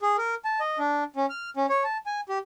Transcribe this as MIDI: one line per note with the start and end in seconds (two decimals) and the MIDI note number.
0.02 0.16 68
0.18 0.35 70
0.45 0.60 81
0.60 0.78 75
0.79 1.04 62
1.16 1.26 61
1.30 1.50 89
1.57 1.66 61
1.69 1.84 73
1.84 1.97 81
2.06 2.21 80
2.29 2.38 67